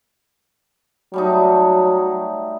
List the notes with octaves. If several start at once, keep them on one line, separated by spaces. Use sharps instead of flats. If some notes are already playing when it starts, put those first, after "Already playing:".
F#3 G3 A3 D#4